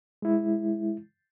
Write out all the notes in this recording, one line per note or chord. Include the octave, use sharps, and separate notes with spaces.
G#3 E4